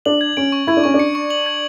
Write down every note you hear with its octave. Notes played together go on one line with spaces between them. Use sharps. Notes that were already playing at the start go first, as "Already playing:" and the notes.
D4 F#7
G#6
C#4 D7
C#6
E4 G#6
D4
C#4 C#6
D4
C#7
C#6
F#7
G#6